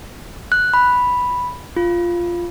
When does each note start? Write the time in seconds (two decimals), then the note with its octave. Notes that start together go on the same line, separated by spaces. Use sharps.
0.52 F#6
0.74 B5
1.77 F4